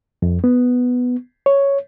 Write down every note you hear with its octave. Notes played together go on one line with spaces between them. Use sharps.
F2
B3
C#5